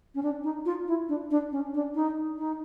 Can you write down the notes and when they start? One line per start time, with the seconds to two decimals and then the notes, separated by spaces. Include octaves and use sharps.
0.15 C#4
0.23 D4
0.44 D#4
0.66 F4
0.88 E4
1.09 D4
1.31 D4
1.52 C#4
1.74 D4
1.95 D#4
2.39 D#4